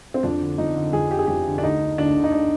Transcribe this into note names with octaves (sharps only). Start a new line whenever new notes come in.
C4
F2 D4
D3
F2 D#4
D3
F2 G#4
D3 G4
G#4
F2 G4
D3
D4
D2 D#4
D3
D2 D4
D3
D#4
D4